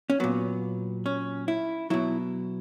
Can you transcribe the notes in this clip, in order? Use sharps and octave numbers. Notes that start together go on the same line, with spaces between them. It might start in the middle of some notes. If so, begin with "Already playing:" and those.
C#4
A#2 F#3 B3
C#4
E4
B2 F#3 E4